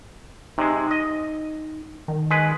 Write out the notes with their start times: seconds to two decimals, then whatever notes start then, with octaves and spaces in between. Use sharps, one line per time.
0.58 C3 G#3 D#4
0.91 D#5
2.08 D#3
2.31 G#3 B4